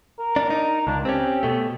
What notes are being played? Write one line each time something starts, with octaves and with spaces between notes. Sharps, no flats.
A#4
D4
D#4
C#2 D4
C4 C#4 G4
B2 A3